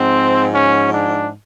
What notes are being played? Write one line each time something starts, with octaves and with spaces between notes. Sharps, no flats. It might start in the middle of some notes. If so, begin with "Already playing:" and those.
Already playing: G#2 F3 C4
C#4
D4